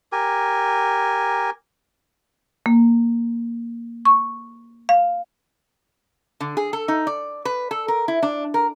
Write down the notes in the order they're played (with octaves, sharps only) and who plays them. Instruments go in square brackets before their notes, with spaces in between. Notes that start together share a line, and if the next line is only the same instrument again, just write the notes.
[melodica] G4 A#4 G#5
[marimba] A#3
C#6
F5
[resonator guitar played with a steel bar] D3
G#4
A4
D#4
D5
B4
A4
A#4
E4
D4
A#4